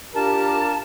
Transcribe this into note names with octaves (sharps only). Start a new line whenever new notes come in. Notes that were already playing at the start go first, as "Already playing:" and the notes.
D4 F4 G4 A#4 A5